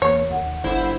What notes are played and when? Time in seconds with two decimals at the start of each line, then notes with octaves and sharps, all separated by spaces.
0.02 E2 A#3 C#5
0.31 D#2 F#5
0.64 G1 D3 E4 C5